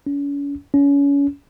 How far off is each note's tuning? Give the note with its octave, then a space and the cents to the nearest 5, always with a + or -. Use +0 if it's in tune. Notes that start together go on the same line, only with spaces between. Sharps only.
C#4 +40
C#4 +30